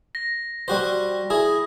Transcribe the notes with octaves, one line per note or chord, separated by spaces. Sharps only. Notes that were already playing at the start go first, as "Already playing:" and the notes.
A#6
G3 F#4 C5
E4 G#4